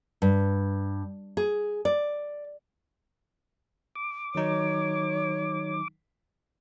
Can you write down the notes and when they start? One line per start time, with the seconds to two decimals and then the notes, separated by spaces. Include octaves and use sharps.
0.22 G2
1.37 G#4
1.85 D5
3.96 D6
4.35 D#3 F#3 D#4 C#5